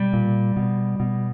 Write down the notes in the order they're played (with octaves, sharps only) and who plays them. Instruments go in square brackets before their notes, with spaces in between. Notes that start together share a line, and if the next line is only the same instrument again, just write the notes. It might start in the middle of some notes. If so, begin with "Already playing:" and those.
Already playing: [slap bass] B2 G3
A#2
B2
B2